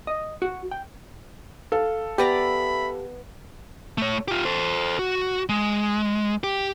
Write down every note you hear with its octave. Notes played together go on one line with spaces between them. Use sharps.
D#5
F#4
G5
A4 F5
B3 G4 D5 E5 A#5 B5
A3 C#5
F4 G4
A4 C5
F#4
G#3
G4